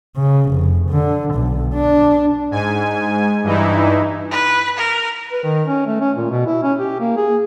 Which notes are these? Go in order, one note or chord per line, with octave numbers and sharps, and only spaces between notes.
C#3
F1
D3
B1
D4
G#2 G#5
G2 E3 D#4 E4
B4
A#4
B4
D#3
C#4
A3
C#4
A#2
B2
E4
C#4
G4
A#3
G#4